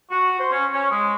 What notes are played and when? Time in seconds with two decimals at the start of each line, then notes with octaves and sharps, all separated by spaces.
0.10 F#4
0.39 C5
0.52 C#4
0.73 C#4
0.90 G#3